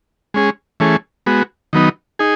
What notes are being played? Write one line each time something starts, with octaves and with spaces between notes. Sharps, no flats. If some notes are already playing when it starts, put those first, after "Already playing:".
G#3 C#4 G#4
E3 A3 C#4 G#4
G#3 B3 F#4
D#3 F#3 B3 D#4
D#4 G#4